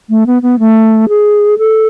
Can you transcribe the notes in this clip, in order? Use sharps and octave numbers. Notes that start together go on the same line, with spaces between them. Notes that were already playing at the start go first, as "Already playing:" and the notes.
A3
B3
B3
A3
G#4
A4